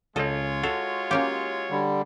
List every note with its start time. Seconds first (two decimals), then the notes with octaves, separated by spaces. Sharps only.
0.16 C#2 G#3 C#4 F4 A4 C#5 D#5
0.63 F#4 A4
1.11 A#3 C#4 G4
1.70 D3 G3